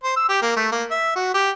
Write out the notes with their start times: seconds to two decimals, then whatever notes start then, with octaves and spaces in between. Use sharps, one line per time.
0.04 C5
0.16 E6
0.29 G4
0.42 A#3
0.56 A3
0.72 A#3
0.91 E5
1.16 F#4
1.34 G4